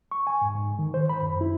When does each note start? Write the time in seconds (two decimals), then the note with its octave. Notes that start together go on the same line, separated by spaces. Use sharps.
0.11 C#6
0.27 G#5
0.41 G#2
0.55 G#2
0.79 D#3
0.94 C5
1.09 B5
1.22 F#2
1.41 E4